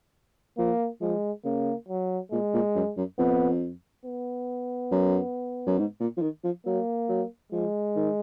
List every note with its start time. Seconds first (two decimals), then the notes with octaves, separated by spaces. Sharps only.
0.58 F3 A#3
1.01 F3 G#3
1.44 C#3 A#3
1.88 F#3
2.31 A#2 G#3
2.54 A#2
2.75 F#2
2.97 F#2
3.18 F2 B3
4.05 B3
4.92 F#2
5.67 F#2
5.78 G#2
6.00 A#2
6.17 F3
6.22 D#3
6.44 F3
6.66 F#3 A#3
7.09 F#3
7.52 F3 G#3
7.96 D#3